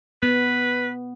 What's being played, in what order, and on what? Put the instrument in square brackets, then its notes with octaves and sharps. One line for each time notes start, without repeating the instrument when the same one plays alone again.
[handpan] B3 [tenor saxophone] B4